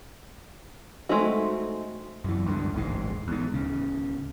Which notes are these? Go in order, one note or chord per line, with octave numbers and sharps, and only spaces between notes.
G#3 A3 C4 D#4 F#4
F#2 E3
C#2 G2 D3
D#1 A1 G#2
E2 G#2
D1 C#3